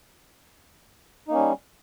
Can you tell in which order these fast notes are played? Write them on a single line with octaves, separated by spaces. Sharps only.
D#4 A#3 C#4 G3